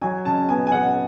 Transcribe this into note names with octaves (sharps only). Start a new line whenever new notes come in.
F#3 G#5
C#3 A5
B3 G#5
G#5
C#3 F#5